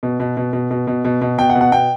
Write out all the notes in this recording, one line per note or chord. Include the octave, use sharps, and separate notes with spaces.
B2
B2
B2
B2
B2
B2
B2
B2
B2 G5
F#5
B2
F#5
B2 G5